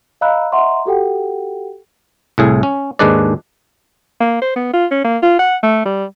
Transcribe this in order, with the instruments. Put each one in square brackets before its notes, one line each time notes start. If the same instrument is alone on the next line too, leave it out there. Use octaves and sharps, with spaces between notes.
[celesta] D#5 F5 A#5 B5 E6 F#6
D#5 E5 F#5 A#5 C6 C#6
F#4 G4 A4 F#5 G5
[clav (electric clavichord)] C2 A2 G#4
C#4
D#2 G#2 G#3 D4 B4 D5
[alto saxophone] A#3
C5
B3
F4
C#4
A#3
F4
F#5
A3
G3